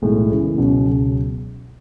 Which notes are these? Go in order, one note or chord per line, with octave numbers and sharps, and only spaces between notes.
B1 A2 E3 G#3
F#2 C#3 E3
C#2 B2 F#3 C#4
C#2 B2 F#3